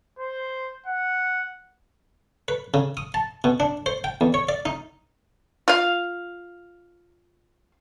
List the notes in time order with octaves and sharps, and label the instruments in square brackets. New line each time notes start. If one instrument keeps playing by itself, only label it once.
[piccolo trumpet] C5
F#5
[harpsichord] B4
C#3
D#6
A5
B2
D4
C5
G5
E2
C#5
D5
D#4
[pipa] F4 F5